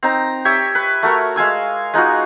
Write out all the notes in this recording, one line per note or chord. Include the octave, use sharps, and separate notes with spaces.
C4 D#4 A#5
G4 C#5 E5
B4
A3 F#4 A#4
G#3 F5 G#5 E6
G#3 D#4 F4 F#4